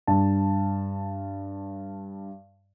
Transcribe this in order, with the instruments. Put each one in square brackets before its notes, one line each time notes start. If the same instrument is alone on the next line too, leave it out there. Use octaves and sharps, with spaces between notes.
[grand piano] G2 A5